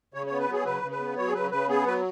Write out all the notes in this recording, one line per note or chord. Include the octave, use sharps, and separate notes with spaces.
C#3 C#5
B3 C#5
B4
F#3 G#4
C#3 B4
C#3
B4
B3
F#3 C#5
G#4
C#3 B4
C#3 B4
B3 G#4
F#3 B4